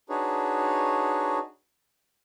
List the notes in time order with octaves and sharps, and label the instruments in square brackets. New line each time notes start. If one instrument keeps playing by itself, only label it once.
[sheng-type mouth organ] D4 D#4 F#4 G#4 B4 C#5